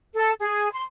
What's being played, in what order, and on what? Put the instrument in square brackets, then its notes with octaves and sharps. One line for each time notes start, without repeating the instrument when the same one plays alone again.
[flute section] A4
G#4
C6